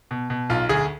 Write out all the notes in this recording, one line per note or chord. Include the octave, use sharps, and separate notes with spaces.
B2
B2
B1 F4
D2 G#4